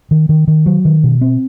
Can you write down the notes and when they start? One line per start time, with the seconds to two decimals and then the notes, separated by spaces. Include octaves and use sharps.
0.11 D#3
0.29 D#3
0.47 D#3
0.66 F#3
0.85 D#3
1.04 B2
1.21 C4